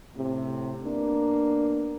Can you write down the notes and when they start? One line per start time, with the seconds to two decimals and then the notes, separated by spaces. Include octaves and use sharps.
0.15 A2 C3
0.83 A#3 B3 D4